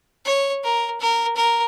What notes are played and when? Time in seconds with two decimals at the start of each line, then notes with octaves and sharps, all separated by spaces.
0.25 C#5
0.63 A#4
1.00 A#4
1.36 A#4